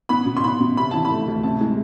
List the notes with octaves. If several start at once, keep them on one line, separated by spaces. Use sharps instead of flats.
B3 B5
B2
C6
B3 B5
B2
C3 B5
E3 A5
B5
A3
D2
C3 A5
G#3